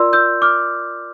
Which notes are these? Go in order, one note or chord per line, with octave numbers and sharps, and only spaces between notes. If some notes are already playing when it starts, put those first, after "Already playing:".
Already playing: F4 A#4 D5 C6 E6
E6 G6
D6 F6